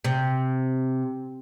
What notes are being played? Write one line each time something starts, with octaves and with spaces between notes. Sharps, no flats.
C3